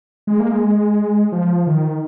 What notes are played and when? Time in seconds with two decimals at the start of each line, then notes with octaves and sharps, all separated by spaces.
0.27 G#3
0.40 A#3
0.52 G#3
1.32 F3
1.67 D#3